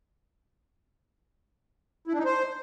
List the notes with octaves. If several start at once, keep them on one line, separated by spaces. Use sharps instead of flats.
E4
D4
D#4
C5